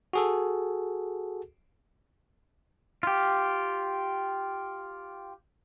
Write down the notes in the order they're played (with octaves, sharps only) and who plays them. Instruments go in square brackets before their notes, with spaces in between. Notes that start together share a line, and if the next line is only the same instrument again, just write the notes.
[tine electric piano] F#4 G#4 A4
[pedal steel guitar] F4 G4